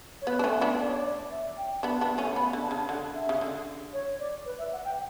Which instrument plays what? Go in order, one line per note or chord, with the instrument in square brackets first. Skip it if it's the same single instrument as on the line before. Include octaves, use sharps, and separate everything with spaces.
[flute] C#5
[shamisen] B3 [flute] B4
[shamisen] D4
A3 C#4
B3 D4
[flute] D5
C#5
D5
E5
G5
[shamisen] B3 D4 [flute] A5
[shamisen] B3 D4
A3 C#4
[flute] A5
[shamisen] B3 [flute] B5
[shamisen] D3
[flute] A5
[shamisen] C#3
[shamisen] D3 [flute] F#5
[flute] E5
[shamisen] C#3
D3
[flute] C#5
D5
B4
E5
F#5
G5